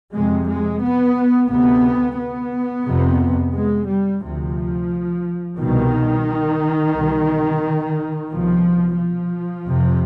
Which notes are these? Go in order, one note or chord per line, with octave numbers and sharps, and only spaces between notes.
F2 C3 G#3
G#3
B3
D2 C3 B3
B3
F2 C3
G#3
G3
D2 C3 F3
C2 B2 D#3
C2 B2
C2 B2 F3
F3
F2 C3